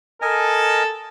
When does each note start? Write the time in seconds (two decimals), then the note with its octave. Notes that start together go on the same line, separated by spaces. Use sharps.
0.22 A4 A#4 D#5 G#5